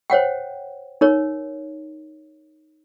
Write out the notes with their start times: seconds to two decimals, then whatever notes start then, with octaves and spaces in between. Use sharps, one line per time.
0.10 C5 C#5 F#5 G5
1.01 D#4 A#4 C#5